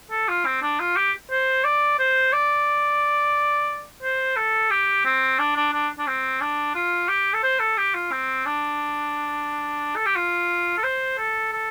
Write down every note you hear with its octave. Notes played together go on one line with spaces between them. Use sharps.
A4
F4
C4
D4
F4
G4
C5
D5
C5
D5
C5
A4
G4
C4
D4
D4
D4
D4
C4
D4
F4
G4
A4
C5
A4
G4
F4
C4
D4
A4
G4
F4
A4
C5
A4
A4